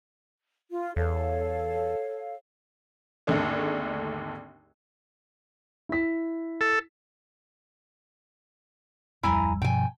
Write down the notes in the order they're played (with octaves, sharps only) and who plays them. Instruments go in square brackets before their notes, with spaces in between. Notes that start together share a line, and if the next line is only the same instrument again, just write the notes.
[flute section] F4
[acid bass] E2 [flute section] A4 C#5 F5
[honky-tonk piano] G#1 D#2 D3 A3 D4 G#4
[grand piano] E4 B6
[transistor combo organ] A4
[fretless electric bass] D1 F2 G3 [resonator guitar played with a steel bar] E4 G#5 A#5
[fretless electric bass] G2 B2 F3 [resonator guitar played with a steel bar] G5 G#5